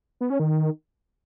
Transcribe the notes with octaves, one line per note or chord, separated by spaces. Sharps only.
B3
C#4
D#3